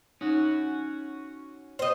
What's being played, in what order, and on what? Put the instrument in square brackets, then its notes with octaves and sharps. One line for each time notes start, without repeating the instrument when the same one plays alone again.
[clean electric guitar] C#4 F#4 [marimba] D#4
[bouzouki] C5 D#5